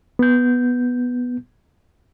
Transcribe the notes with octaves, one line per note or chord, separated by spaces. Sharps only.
B3 G6